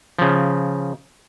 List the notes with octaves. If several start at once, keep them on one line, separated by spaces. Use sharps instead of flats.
C#3 F3